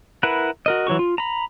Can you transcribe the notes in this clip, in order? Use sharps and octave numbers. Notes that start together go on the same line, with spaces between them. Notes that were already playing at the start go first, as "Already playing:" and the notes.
E4 A#4 B4 F#5
F#4 A#4 D#5
E3 F#3 G4 C#6
F4
A#5 B5